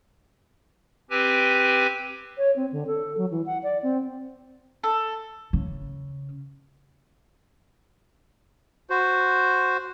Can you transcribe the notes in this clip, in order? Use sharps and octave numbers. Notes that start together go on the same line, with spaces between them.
C4 G4 B4 G#5
C#5
C4
D3
A4
F#3
E3
F#5
D5
C4
A4
C#3
F#4 C5